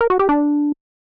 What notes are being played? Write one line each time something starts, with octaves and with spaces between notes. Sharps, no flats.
A#4
F#4
G4
D4